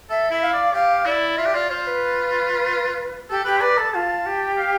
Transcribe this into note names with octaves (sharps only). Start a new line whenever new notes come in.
A4 E5
E4 E5
F5
D5
G4 F5
E4 D5
F4 E5
G4
F4 D5
F4 C5
B4
G4 A4
G4 B4
B4 D5
A4 A5
F4 A5
G4
F5